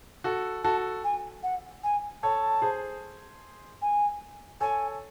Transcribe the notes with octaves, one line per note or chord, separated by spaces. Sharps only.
F#4 A4
F#4 A4 A5
G#5
F#5
G#5
A4 C#5 A5
G#4 C5
G#5
A4 C#5 G#5